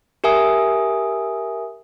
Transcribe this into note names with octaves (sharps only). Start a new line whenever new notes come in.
G4 A#4 E5 G#5 D#6